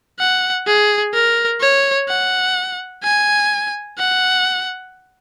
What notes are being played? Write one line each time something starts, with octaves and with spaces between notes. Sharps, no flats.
F#5
G#4
A#4
C#5
F#5
G#5
F#5